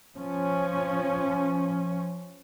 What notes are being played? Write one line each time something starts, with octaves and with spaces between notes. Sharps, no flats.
F3 C#4